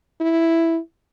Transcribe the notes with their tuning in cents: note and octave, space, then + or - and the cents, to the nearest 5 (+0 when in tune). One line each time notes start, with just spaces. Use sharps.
E4 +0